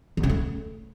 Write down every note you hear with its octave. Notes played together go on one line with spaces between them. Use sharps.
E2
C#3
A3